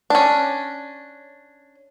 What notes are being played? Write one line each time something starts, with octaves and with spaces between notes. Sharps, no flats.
C#4 D4